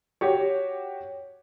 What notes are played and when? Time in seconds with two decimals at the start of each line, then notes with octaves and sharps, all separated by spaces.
0.21 F#4 G4 C#5